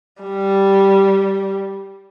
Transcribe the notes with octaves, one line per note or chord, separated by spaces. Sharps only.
G3